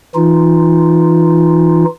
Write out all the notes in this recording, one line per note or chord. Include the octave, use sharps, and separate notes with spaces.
E3 D#4 F4